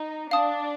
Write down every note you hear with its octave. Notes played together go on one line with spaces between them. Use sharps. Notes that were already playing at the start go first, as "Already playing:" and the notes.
Already playing: D#4
D4 F5 A5 D#6